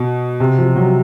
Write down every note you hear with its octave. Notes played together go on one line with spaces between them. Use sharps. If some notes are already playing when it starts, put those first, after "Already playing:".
Already playing: B2
C3
F3
F#3